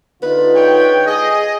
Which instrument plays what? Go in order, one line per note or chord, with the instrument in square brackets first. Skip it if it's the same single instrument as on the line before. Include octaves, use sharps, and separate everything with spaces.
[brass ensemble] D3 D#4 F4 [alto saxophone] B4
[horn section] G#3 C#5 G5
[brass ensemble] G#4 [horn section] D#5